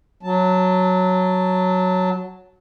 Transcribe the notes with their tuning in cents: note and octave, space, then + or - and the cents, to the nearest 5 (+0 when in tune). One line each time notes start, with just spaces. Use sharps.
F#3 +0 A5 +0